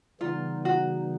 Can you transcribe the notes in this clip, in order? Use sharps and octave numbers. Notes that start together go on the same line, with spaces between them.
C#3 E3 G3 B3 D#4 F4
F#4